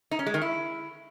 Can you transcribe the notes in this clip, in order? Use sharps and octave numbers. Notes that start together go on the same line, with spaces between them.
D#4
C#4
G#3
D#3
E4